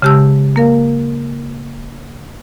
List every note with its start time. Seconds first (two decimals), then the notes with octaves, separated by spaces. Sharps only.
0.02 C#3 G#3 G4 A5 E6
0.56 A#3 A#4 F5